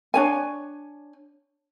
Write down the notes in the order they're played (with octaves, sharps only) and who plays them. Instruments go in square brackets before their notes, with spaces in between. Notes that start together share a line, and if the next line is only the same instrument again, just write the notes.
[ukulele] D4 C#5 G#5